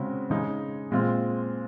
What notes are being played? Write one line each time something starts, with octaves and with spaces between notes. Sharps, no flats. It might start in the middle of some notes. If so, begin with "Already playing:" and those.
Already playing: C#3 G#3 C4 F#4
C#3 G#3 D#4 G#4
A#2 G#3 C4 F4